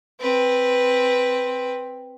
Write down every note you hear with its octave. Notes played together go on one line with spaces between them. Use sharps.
C4 B4